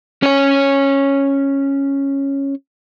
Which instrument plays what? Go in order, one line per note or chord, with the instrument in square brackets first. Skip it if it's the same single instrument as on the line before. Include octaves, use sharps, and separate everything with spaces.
[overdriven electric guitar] C#4 C#5